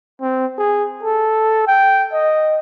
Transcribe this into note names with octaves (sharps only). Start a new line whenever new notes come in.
C4
G#4
A4
G5
D#5